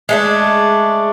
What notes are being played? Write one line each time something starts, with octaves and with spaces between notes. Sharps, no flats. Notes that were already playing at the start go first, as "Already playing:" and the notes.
G#3 A3 D4